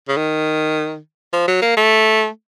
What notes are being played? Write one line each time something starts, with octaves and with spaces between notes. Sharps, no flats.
C#3
D#3
F3
F#3
A#3
A3